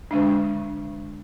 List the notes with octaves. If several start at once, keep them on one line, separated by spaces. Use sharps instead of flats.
D3 G#3 D4